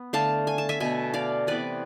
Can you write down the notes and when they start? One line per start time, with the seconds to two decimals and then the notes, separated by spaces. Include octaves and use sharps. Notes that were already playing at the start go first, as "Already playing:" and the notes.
Already playing: B3
0.13 D3 A3 F5 A5
0.47 G#5
0.58 A5
0.69 E5 G#5
0.80 B2 A3 E5 G#5
1.14 D5 F5
1.47 C3 E3 B3 B4 D5